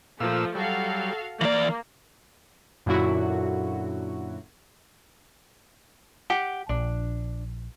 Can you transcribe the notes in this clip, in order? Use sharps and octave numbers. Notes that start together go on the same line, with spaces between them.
A#2 F3 A3 F5 E6
F#3 G3 F#4 A4 F5
E3 A#3 D5 F5
F#2 A#2 D3 F#3 E4 F#4
G4 F#5
A#1 D4